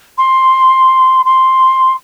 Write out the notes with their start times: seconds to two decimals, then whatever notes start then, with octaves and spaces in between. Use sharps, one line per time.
0.17 C6
1.25 C6